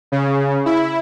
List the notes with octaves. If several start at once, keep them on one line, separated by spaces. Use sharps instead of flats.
C#3
E4